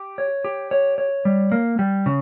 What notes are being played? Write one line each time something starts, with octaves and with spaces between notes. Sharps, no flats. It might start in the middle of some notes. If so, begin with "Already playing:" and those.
Already playing: G4
C#5
G4
C#5
C#5
G3
A#3
G3
C#3